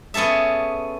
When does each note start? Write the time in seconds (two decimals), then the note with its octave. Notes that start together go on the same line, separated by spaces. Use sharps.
0.14 B3 C#4 G#4 A4 E5